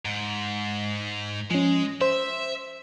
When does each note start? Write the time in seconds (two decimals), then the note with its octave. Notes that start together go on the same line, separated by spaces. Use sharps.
0.05 G#2
1.51 F3 G#3 C#4
2.01 C5 E5